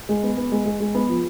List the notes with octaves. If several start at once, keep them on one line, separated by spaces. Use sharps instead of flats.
G#3
B3
B3
G#3
G#3
G#3
B3
F3